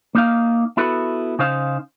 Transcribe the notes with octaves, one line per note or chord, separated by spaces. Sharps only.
A#3 D#4 F5
B3 E4 F#4 A4 B4
C#3 D#4 C5 F5